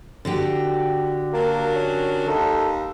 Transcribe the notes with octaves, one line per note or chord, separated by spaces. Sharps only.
D3 F#4 G4
F#3 A#3 D4 A#4
C#4
D#2 D#4 A4